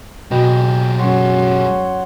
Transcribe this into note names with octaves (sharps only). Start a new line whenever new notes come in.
B2 F#3 G#3 G5
F#2 C#5 F#5 C6